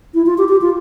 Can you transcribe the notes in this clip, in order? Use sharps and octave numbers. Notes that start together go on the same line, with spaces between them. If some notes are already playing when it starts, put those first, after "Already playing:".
E4
F4
G4
G4
F4